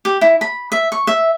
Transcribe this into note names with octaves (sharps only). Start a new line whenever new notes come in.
G4
E4
B5
E5
C#6
E5